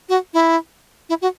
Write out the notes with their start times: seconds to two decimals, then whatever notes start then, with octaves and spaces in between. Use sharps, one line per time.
0.09 F#4
0.34 E4
1.09 E4
1.22 F#4